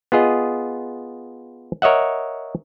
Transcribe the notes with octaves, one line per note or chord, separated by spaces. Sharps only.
B3 F4 G#4 D#5
A#4 C#5 D#5 E5 F#5